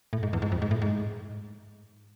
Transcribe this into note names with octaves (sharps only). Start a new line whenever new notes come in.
A2
G#2
E2
G#2
F2
G#2
A2
G#2